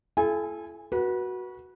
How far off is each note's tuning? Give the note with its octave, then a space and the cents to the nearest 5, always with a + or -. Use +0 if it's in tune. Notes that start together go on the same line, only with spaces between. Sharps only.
E4 +35 A4 -40 G#5 -25
F#4 +0 B4 -30